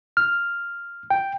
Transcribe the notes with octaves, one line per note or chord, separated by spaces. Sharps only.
F6
G5